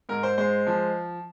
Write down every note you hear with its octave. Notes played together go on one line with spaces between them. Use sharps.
G#2 A#4
C5
G#3 C5
F3